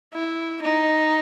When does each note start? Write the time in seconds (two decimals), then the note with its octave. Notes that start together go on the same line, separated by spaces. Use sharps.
0.14 E4
0.62 D#4